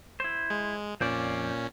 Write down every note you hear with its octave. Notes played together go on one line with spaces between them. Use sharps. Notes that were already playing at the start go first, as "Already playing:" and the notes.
E4 C5
G#3
F2 A#2 C#4 C5 D5